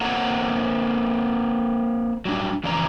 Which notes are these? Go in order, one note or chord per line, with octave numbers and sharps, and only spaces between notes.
A#3 C4 A4 C#5 F#5 A#5
F#3 G3 D4
F2 C#3 E3 D5 A5 A#5